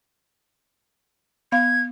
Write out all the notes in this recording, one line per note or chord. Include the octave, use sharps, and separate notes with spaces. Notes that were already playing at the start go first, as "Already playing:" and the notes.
B3 F5 G#6